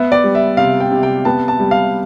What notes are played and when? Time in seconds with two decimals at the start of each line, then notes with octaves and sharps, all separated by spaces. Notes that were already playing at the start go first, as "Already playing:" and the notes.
Already playing: B3 E5
0.12 D5
0.24 G3
0.35 E5
0.57 C3 F5
0.80 G5
0.91 C3
1.03 G5
1.25 B3 A5
1.48 A5
1.60 G3
1.71 F5